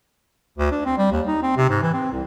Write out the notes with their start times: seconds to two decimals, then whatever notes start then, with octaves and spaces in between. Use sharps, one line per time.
0.58 D2
0.72 D4
0.86 C4
0.98 G3
1.12 D#2
1.27 D#4
1.43 C4
1.57 C3
1.70 G#2
1.82 E3
1.94 C4
2.12 C2